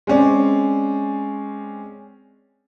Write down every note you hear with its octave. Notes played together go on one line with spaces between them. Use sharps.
G#3 C4 C#4 D5